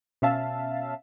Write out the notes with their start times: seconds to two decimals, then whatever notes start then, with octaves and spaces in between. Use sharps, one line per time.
0.22 B2 C#4 E5 F5 A5